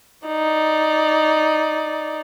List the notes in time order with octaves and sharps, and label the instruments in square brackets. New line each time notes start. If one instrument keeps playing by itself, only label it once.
[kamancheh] D#4 D5